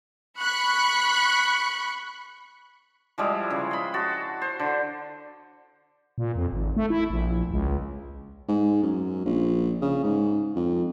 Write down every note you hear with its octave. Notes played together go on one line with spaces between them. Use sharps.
B5 C#6 F#6 C#7
F3 G3 G#3 E4
C#3
B5 C6
F#4 A5
C5
D3
A#2
F2
G#1
A3
E4
A#1
C#2
G#2
F#2
A#1
C#3
G#2
F2